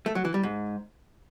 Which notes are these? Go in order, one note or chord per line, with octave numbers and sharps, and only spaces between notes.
A3
F#3
E3
G3
G#2